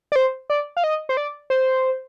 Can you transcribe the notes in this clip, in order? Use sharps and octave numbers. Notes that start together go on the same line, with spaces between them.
D5
C5
D5
F5
D#5
C5
D5
C5